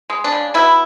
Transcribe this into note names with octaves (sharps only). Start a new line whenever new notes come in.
G#3
D4
C#3
B2 E4